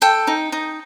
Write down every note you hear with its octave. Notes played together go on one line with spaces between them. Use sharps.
A4 G5
D#4
D#4